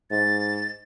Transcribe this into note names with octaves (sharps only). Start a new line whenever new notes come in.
G#2 A6